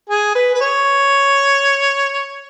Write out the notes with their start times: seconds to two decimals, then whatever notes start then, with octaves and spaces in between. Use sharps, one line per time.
0.10 G#4
0.35 B4
0.55 B4
0.61 C#5